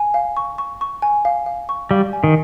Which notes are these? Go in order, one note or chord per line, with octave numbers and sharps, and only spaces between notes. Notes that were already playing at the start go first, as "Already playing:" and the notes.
Already playing: G#5
F5
C#6
C#6
C#6
G#5
F5
F5
C#6
G3 F5
G#5
D#3